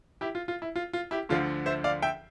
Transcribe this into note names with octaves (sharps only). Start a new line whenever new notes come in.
E4 G4
F4
F4
E4
F4
F4
E4 G4
D2 D3 F3 F4
C5 E5
D5 F5
E5 G5